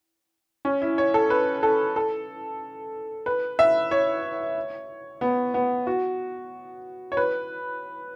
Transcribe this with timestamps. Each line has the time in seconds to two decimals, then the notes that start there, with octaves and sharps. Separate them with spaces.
0.65 C#4
0.82 E4
0.98 C#5
1.14 A4
1.30 B4
1.63 A4
1.96 A4
3.26 B4
3.59 E5
3.91 C#5
5.21 B3
5.54 B3
5.87 F#4
7.12 C#5
7.17 B4